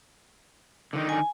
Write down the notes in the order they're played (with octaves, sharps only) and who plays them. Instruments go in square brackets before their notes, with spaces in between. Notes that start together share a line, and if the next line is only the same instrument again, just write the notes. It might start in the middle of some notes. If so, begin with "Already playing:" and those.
[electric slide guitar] D3 D#3 D#4
[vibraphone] G#5